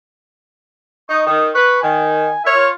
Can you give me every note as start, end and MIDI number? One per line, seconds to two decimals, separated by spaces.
1.10 1.23 63
1.10 1.25 85
1.26 1.49 51
1.26 1.44 87
1.55 1.81 71
1.55 1.80 85
1.82 2.28 51
1.82 2.44 80
2.45 2.67 70
2.45 2.67 73
2.45 2.56 76
2.56 2.74 65